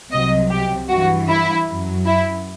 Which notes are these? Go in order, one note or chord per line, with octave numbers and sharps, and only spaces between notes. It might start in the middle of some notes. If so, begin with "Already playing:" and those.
C2 C3 F#3 D#5
G4
G2 E3 F#4
E4
F#2 F#3
E4